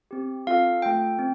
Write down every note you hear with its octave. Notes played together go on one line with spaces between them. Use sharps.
C4 G4
C4 F4 A4 F5
A3 F4 A4 G5
C4